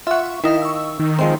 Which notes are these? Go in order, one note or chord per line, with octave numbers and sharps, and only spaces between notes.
F4 E5 F#5 C#6
D#3 E4 D#5 F5
C#6 E6
D#3
F3 G#3 C4 C6